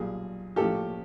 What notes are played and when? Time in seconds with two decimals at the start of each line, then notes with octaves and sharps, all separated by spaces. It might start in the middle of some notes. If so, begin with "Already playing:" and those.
Already playing: B1 A#2 G3 G#4
0.56 A#1 A2 F3 G4 A4